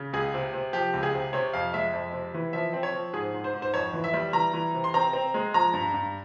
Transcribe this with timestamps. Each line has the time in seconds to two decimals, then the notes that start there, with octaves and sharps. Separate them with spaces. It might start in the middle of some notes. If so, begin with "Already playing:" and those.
Already playing: C#3
0.13 C#2 G#4
0.34 C3
0.53 C3
0.73 F3 G4
0.93 C#2
1.03 G#4
1.14 C3
1.33 C3 C#5
1.53 F2 F5
1.74 G#3 E5
1.93 F2
2.13 C3
2.34 E3
2.53 F3 E5
2.73 C4
2.83 C#5
2.94 F3
3.13 G#2 G#4
3.34 G#2
3.44 C5
3.54 G#2
3.62 C5
3.74 F2 C#5
3.93 E3
4.04 E5
4.14 G3
4.33 E3 A#5
4.53 E3
4.74 C3
4.84 C6
4.94 C4 A#5
5.13 C4
5.34 G#3
5.54 F3 A#5
5.74 G2
5.94 G2